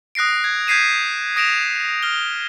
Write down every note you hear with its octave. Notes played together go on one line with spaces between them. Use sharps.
D#6 F#6 A#6 C7 D7
G#6
G6 G#6 B6 C7 D#7 E7
D#6 A#6 D7 E7 F7
F6 G7